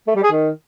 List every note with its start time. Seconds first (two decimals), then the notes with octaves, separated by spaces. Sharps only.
0.08 A3
0.16 G3
0.24 G#4
0.32 D#3